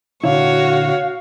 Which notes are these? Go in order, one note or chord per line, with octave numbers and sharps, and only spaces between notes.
A#2 D3 E4 F#4 C#5 F5